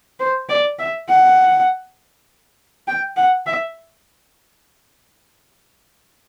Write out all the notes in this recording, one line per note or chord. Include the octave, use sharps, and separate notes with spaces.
C5
D5
E5
F#5
G5
F#5
E5